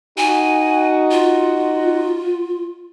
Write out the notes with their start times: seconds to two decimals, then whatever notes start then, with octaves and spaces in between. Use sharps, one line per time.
0.18 D#4 F#4 G#5
1.11 F4